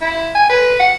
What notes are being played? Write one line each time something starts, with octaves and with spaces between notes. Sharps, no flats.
E4
G#5
B4
F#5